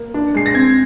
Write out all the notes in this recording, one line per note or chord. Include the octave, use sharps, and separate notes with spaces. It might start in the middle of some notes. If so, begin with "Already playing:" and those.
Already playing: A#3
D4
G#3 C7
A#6
C4 G#6